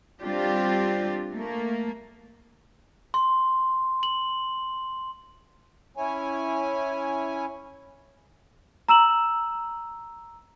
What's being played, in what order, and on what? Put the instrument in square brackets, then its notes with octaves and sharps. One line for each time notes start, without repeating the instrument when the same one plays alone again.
[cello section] G3 C4 D4 F4 G4
A3 A#3
[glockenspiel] C6
F#7
[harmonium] C#4 E4 C#5 G#5
[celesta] A#5 E6 E7 F#7